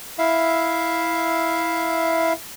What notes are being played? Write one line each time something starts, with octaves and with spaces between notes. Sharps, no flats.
E4 E5 F5